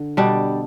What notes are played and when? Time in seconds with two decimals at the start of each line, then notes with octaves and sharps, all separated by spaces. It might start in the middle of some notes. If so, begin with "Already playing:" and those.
Already playing: D3
0.17 B2 G3 D4